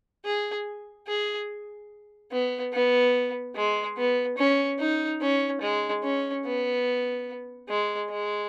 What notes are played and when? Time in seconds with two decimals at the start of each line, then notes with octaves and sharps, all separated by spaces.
0.25 G#4
1.08 G#4
2.32 B3
2.73 B3
3.56 G#3
3.97 B3
4.38 C#4
4.79 D#4
5.21 C#4
5.62 G#3
6.04 C#4
6.45 B3
7.69 G#3
8.10 G#3